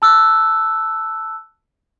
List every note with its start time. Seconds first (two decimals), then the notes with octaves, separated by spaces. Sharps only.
0.02 A5 E6 F#6